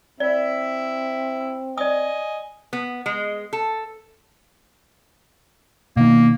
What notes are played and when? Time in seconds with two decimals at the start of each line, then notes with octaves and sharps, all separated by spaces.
0.20 C4 E4 D5 E5
1.78 D5 D#5 G#5 D#6
2.73 B3
3.06 G#3
3.53 A4
5.97 B2 D#3 A#3